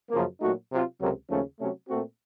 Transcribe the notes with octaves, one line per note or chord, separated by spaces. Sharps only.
F#2 C#3 F3 A#3
A#2 F#3 A3 D#4 F#4
C3 F#3 C4 F4
C#2 C3 F#3 A#3
D#2 C#3 F3 A3 C#4
C3 F#3 A3 C#4
A#2 A3 C4 F#4